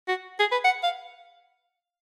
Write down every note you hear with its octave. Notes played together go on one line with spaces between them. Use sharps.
F#4
G#4
B4
F#5
F5